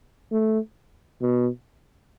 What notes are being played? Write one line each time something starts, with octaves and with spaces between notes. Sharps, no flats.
A3
B2